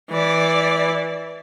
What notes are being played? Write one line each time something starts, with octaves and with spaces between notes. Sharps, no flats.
E3 D5